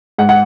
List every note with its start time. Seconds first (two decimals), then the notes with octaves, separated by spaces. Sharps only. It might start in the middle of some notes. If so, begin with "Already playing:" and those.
0.18 G#2 F#5
0.29 F#5